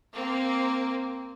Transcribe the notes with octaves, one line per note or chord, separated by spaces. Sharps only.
A#3 C4